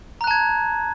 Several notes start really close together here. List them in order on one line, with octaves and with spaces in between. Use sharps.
A#5 F#6 A5 G#6